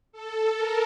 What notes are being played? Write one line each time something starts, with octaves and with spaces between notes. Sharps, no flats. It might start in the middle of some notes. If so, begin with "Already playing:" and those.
A4
A#4